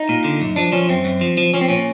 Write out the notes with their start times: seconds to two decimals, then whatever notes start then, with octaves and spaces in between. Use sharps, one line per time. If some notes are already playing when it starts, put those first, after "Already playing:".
Already playing: D#4
0.09 A#2
0.24 D3
0.41 F#2
0.56 F3 D4
0.72 F3 C#4
0.89 F#2 C4
1.05 F#2
1.21 F3
1.38 F3
1.54 F3 C#4
1.61 C4
1.69 A#2 C#4